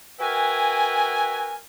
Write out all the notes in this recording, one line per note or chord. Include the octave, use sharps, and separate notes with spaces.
F#4 A#4 B4 E5 G5 G#5